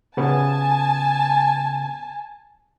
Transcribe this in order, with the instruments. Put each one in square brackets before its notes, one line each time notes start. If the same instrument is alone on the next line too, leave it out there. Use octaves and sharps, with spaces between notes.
[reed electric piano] C#3 B3 [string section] G#5 A5